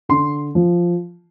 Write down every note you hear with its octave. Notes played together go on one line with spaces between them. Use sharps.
D3 C6
F3